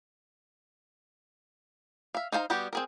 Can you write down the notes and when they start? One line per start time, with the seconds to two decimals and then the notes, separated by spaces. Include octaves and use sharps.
2.15 E5 F5
2.32 D#4 C5 F5 A5 A#5
2.50 G3 B3 F#4 G4
2.73 C4 G#4 A#4